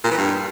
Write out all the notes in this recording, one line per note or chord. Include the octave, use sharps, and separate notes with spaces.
A#2
E3
G2